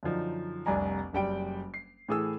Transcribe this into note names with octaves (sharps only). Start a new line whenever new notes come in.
F#2 D3 F3 D#4
F1 C2 D4 G#5 A#5
F#1 G3 G5 D7
C7
A2 E3 G#4 A4 E6